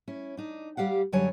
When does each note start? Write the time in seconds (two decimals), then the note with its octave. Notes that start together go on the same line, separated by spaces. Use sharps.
0.08 C#4 E4
0.37 D4 D#4
0.77 G3 G4 F5 F#5
1.12 F#2 D3 F#3 G3 C#5 G#5